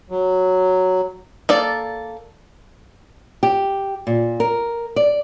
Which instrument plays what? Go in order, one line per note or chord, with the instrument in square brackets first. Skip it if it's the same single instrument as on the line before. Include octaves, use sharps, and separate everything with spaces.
[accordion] F#3
[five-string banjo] A#3 A4 D5
[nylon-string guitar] G4
A#2
A#4
D5